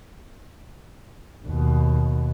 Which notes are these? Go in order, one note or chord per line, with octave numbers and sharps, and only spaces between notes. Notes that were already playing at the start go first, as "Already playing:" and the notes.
D#2 B2